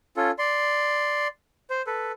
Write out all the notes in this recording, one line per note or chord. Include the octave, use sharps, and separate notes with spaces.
C#4 F4 A4
D5 C6
C5
A4 B4